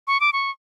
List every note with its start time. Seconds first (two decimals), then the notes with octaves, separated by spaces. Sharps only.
0.07 C#6
0.20 D6
0.33 C#6